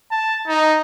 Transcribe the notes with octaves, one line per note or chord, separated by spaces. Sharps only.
A5
D#4